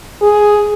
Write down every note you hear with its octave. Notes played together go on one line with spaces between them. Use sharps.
G#4